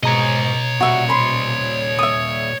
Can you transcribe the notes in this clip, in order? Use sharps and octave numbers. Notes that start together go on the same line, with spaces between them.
G#2 B2 C#5 D#5 A#5
A#2 G3 F#4 E5
C5 B5 C6
E5 D#6